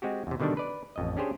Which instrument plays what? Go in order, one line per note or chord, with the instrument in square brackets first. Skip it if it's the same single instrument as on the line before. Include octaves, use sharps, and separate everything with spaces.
[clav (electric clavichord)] G#3 C4 F#4 G4
E2 C3
B2 D3 D#3 G3 D4
B4 D5
A1 F2 D#5
C#4 D4 G4 G#4 C5 C#5